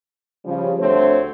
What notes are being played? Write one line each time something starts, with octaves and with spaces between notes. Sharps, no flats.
C#3 F3 G3
D2 D3 A3 C4 C5 C#5